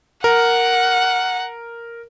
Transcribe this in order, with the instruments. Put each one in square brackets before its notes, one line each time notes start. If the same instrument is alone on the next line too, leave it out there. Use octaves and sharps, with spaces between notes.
[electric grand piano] A#4 [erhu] F#5